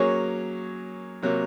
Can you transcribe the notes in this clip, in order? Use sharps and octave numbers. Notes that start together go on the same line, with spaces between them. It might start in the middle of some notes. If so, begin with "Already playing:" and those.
Already playing: F#3 A#3 C#4 G#4 C#5
C3 F#3 A#3